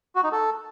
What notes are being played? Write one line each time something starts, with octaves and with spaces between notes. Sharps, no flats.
F#4
D#4
A4